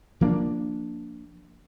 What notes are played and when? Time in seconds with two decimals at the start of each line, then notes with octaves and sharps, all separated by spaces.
0.21 F3 A#3 D4